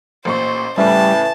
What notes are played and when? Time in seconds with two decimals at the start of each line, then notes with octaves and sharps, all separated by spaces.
0.25 A1 A#2 C5 C#6
0.78 A2 C#3 E3 G3 A5